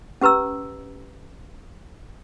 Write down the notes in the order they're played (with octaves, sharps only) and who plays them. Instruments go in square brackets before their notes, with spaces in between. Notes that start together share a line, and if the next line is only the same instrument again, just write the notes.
[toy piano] C#4 G4 B4 A#5 E6